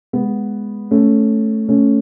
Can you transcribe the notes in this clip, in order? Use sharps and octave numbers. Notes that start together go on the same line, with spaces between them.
G#3 B3
A3 C#4
A3 C#4